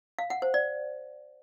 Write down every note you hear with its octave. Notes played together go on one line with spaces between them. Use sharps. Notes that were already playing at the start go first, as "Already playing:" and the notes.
F5
F#5
C5
D5